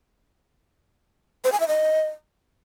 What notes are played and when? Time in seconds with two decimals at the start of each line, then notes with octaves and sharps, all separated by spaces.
1.44 C5
1.52 G#5
1.60 E5
1.68 D#5